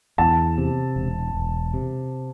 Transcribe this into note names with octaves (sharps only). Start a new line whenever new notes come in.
E2 A5
C3
E1
E1
C3